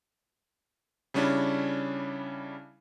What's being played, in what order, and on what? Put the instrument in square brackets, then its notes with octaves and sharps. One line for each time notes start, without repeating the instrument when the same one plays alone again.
[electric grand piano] C#3 G3 C#4 D4 E4